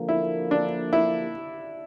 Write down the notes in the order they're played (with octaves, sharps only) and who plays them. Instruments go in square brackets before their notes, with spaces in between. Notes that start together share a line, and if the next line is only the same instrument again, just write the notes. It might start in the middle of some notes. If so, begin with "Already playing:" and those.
Already playing: [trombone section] D3 F3 A#3
[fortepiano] E4
D4
E4